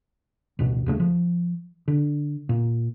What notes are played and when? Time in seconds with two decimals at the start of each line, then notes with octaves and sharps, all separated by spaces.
0.59 A1 D2 B2
0.86 D#2 C#3 E3 A3
1.00 F3
1.88 D3
2.49 A#2